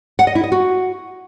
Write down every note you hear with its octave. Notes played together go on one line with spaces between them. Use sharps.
F#5
D#5
E4
D#5
F#4